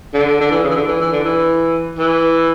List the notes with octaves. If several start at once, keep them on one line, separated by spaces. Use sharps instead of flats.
D3
D3
E3
C#3
E3
D3
E3
E3
D3
E3
E3